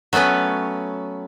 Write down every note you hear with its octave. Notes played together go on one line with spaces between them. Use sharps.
F#3 A3 B3 C#4 B4